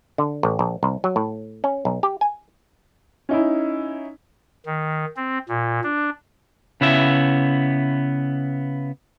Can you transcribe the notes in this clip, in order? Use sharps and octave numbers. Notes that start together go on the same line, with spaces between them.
D3
A1
A#1
C2
F#3
A2
C#4
B1
G4
G#5
C#4 D#4 E4
D#3
C4
A#2
D4
C#3 B3 E4 E5